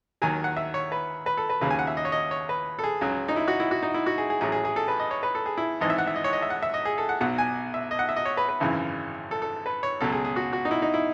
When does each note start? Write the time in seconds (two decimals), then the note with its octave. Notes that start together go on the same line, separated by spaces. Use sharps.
0.22 D#2 D#3 F#3 G#5
0.44 F#5
0.57 E5
0.74 C#5
0.92 B4
1.26 B4
1.37 A4
1.50 B4
1.61 D#2 C#3 F#3 B4
1.70 G#5
1.79 F#5
1.87 E5
1.97 D#5
2.05 C#5
2.12 D#5
2.31 C#5
2.49 B4
2.79 A4
2.84 G#4
3.01 C#2 C#3 F#3
3.28 D#4
3.36 E4
3.48 F#4
3.60 E4
3.71 F#4
3.82 D#4
3.94 E4
4.06 F#4
4.18 G#4
4.30 G#4
4.41 A1 A2 F#3 G#4
4.52 G#4
4.65 G#4
4.76 A4
4.88 B4
5.00 D#5
5.11 C#5
5.23 B4
5.35 A4
5.46 G#4
5.58 E4
5.81 G#1 G#2 E3 D#5
5.90 E5
5.98 F#5
6.07 E5
6.16 D#5
6.24 C#5
6.33 D#5
6.42 E5
6.50 F#5
6.63 E5
6.74 D#5
6.85 G#4
6.98 A4
7.09 F#5
7.21 B1 B2 F#3 F#5
7.38 G#5
7.74 E5
7.91 D#5
7.99 F#5
8.09 E5
8.16 D#5
8.25 C#5
8.37 B4
8.49 B4
8.60 G#1 F#2 C#3 E3
9.31 A4
9.42 A4
9.66 B4
9.83 C#5
10.01 C#2 B2 F#3 A4
10.12 G#4
10.25 G#4
10.36 F#4
10.53 F#4
10.65 D#4
10.71 E4
10.82 D#4
10.94 E4